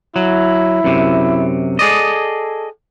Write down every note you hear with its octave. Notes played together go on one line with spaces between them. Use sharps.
F#3 E4
F#2 C3
G#4 A4 D5 D#5